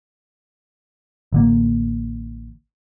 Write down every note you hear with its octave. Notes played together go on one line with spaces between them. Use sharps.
A1 D3 A#3